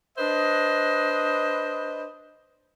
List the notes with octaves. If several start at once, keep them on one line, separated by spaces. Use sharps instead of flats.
D4 B4 C5 D#5